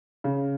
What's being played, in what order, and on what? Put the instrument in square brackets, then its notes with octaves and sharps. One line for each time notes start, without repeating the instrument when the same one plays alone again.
[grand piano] C#3